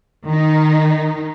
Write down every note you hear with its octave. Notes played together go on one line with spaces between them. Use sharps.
D#3 D#4